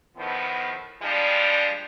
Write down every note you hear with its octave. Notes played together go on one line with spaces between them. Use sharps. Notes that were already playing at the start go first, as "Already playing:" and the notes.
A2 D#3 F3 B3
F3 G3 G#3 D4